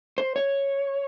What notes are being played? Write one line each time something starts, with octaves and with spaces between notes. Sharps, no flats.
C5
C#5